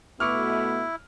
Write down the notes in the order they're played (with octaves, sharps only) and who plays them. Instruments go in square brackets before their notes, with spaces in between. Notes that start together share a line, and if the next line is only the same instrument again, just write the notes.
[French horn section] B2 A3 B3 [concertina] E4 [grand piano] C#6 D6 F6